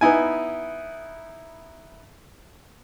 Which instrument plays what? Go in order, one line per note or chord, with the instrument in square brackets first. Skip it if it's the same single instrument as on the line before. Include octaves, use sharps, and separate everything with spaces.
[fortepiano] B3 D#4 E4 G#5